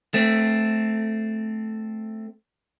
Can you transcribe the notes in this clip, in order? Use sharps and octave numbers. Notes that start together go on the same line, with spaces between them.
A3 C4